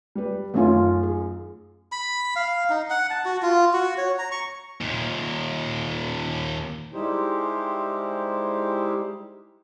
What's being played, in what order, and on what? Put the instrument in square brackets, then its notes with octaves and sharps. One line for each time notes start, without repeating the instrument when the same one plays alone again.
[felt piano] G3 B4
[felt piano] F#2 D#3 G#5 [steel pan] A3 C#4 F4
[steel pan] G#4
[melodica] B5
F5
D#4
F#5
A5
F#4
F4
F#4
C#5
A#5
C#6
[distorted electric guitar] D#2 A#2
[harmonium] G3 G#3 D#4 E4 G4 C5